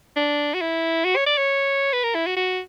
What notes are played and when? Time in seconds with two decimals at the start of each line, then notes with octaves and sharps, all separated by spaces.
0.16 D4
0.54 F#4
0.61 E4
1.05 F#4
1.16 C#5
1.26 D5
1.38 C#5
1.93 B4
2.04 A#4
2.15 E4
2.26 F#4
2.36 F#4